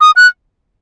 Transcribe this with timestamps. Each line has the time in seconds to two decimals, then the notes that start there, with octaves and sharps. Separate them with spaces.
0.01 D#6
0.16 F#6